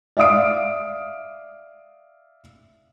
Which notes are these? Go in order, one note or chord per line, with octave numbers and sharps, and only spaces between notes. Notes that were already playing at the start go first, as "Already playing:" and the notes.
D5 E5 F5 D#6 D7